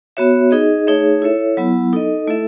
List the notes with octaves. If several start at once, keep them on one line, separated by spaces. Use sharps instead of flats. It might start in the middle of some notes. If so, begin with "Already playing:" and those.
B3 F#4 C#5 E5
D#4 G#4 D#5
A3 D#4 G#4 C#5 E5
E4 A4 C#5 E5
F#3 B3 E4
D#4 A4 D#5
A3 E4 A4 E5